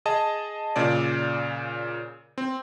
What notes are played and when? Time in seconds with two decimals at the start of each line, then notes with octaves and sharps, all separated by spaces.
0.06 G#4 D#5 A5
0.76 A#2 C#3 D5
2.38 C4